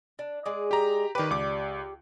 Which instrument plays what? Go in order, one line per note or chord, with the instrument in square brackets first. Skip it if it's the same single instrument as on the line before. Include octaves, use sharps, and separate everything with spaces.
[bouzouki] D4
G#3 G#4 D5
[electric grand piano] G4 A#5
[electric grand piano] D#3 B4 [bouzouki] G4 D5
[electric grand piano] C#2 D6